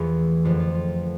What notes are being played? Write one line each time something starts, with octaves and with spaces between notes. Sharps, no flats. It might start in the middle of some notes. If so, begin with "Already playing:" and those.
Already playing: E2 E3 A3 F4
F2 D3 F3 F4
F4
F4